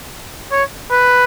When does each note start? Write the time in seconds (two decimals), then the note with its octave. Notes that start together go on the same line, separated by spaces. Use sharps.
0.52 C#5
0.91 B4